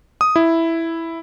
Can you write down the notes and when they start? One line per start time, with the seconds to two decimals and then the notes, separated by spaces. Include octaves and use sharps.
0.21 D#6
0.36 E4